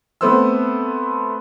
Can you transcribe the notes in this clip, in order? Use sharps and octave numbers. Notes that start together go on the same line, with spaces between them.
A3 B3 C4 C5 E6